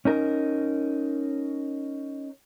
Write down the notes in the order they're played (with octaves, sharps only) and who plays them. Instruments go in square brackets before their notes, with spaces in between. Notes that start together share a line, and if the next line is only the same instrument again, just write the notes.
[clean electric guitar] C#4 D#4 A#4